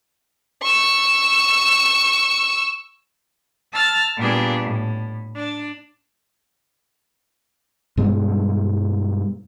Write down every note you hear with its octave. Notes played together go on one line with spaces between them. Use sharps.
C#6 E6
A5 E6 F6 A6
A#2 G3 A#3 B3 D4 G#4
A2
D4
G2 B2 G3 G#3